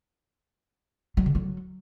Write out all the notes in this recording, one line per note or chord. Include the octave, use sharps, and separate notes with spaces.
F#3
D3
F#3